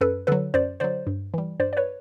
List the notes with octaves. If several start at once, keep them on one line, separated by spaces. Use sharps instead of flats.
F#2 A4 B4
D3 F#3 A4 B4
F#2 C5 D5
D3 F#3 C5 D5
G2
E3 G3
G2 C5 D5
D5
B4 C#5